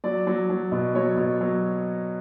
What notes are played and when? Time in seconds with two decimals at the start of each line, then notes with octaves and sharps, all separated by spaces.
0.04 F#3 D5
0.27 F#3
0.50 F#3
0.72 B2
0.94 F#3 C#5
1.17 B2
1.41 F#3